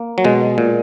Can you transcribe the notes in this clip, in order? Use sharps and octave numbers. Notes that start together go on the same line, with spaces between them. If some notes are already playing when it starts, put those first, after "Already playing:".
Already playing: A#3
F#3
B2 G#3
A#2